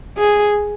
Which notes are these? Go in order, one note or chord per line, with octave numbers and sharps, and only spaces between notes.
G#4